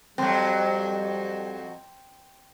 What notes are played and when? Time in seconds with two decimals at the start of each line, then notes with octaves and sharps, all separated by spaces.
0.18 F2 F#3 G3 C4